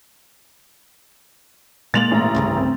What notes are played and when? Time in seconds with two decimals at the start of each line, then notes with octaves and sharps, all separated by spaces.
1.94 A#2 G#3 A#3 A6 F7 F#7
2.11 A1 A#5
2.35 C2 G2 C#3
2.57 C4